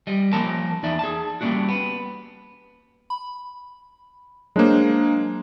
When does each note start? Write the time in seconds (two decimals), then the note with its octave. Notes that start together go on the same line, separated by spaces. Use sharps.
0.07 G3 D#5
0.33 F3 A#3 C#4 A#4 A5
0.83 E2 D#4 D5 E5
0.99 G#4 A5
1.41 G3 A#3 C#4 D4 F#4
1.69 B3
3.10 B5
4.56 F#3 G#3 A#3 D4 C5